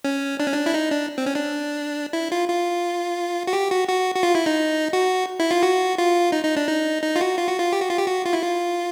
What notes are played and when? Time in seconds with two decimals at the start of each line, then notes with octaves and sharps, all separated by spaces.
0.04 C#4
0.40 D4
0.47 C#4
0.53 D4
0.66 E4
0.74 D#4
0.91 D4
1.18 C4
1.26 C#4
1.35 D4
2.13 E4
2.32 F4
2.49 F4
3.47 F#4
3.53 G4
3.71 F#4
3.88 F#4
4.15 F#4
4.23 F4
4.35 E4
4.46 D#4
4.93 F#4
5.40 E4
5.51 F4
5.63 F#4
5.98 F4
6.32 D#4
6.44 D#4
6.56 D4
6.68 D#4
7.03 D#4
7.16 F4
7.21 F#4
7.38 F4
7.48 F#4
7.58 F4
7.73 G4
7.81 F#4
7.90 F4
7.98 G4
8.07 F#4
8.25 F4
8.33 E4
8.42 F4